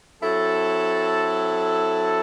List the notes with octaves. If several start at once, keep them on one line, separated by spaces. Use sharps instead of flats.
F#3 C4 E4 A4